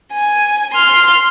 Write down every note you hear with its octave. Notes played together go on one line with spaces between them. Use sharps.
G#5
C6 F6